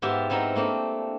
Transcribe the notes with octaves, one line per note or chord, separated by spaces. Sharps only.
G#2 B3 F4 G4 E5
B3 C4 D#4 E4 A#4
A3 A#3 C4 D4